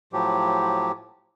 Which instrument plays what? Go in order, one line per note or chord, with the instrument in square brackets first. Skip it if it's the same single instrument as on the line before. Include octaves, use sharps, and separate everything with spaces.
[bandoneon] A2 F3 F#3 G4